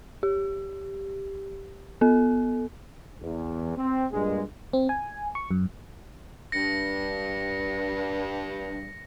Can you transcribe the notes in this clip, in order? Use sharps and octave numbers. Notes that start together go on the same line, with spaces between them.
G4
B3 A4
E2
C4
G2 A#2 G#3
C4
G#5
C#6
F#2
G2 A#6 C#7